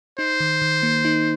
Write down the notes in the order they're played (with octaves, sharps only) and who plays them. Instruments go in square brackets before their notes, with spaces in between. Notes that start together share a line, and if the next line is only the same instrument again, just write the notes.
[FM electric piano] D#4 [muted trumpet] C5
[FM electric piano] D#3
D#3
A#3
D#4